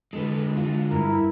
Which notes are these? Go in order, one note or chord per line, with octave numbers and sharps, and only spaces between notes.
D3 G#3 A4 B4
F4
G2 E4 A#4